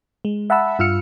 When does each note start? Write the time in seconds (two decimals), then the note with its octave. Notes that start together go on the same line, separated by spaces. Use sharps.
0.25 G#3
0.50 E5 F#5 A5 B5 E6
0.79 G2 F4 E6 F6 C#7